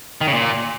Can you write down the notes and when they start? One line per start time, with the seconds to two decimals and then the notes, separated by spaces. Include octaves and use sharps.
0.21 D#3
0.28 C#3
0.34 A#2